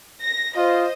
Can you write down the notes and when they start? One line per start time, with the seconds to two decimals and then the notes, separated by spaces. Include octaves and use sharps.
0.23 A#6
0.57 F4 C5 D#5